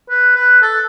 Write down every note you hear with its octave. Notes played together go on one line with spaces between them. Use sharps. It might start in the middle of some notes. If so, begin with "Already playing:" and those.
B4
B4
A4